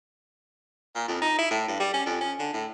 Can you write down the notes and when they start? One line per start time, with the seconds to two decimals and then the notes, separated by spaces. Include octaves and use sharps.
0.96 A#2
1.08 F2
1.22 D#4
1.39 E4
1.51 A2
1.68 G2
1.80 G3
1.94 C#4
2.06 F2
2.21 C#4
2.39 D3
2.53 A2